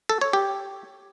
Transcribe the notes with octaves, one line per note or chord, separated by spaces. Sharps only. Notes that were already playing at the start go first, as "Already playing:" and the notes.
A4
C#5
G4